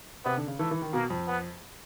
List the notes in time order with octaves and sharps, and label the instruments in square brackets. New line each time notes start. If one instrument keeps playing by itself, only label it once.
[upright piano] C3 [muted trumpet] B3
[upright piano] D3
C#3
[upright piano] E3 [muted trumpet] A3
[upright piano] E3
D#3
[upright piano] B2 [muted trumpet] A#3
[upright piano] F2
[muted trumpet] B3